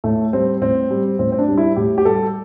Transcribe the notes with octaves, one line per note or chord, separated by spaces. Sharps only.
A2 A3
G3 C4
A2 C4
G3
A2 C4
C4
D4
G3
E4
A2 G4
G4
G3 A4